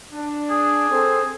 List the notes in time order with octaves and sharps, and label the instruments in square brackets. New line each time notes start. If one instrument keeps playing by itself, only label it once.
[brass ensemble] D4
[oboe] G#4
[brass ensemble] C4 A4 C5